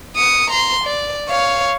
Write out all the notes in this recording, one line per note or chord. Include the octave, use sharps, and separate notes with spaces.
D#6 C#7
A#5 C6
D5
C#5 F5